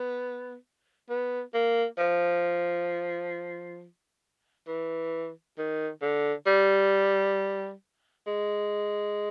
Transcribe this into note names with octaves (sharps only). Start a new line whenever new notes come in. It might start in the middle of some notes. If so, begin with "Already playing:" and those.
Already playing: B3
B3
A#3
F3
E3
D#3
D3
G3
G#3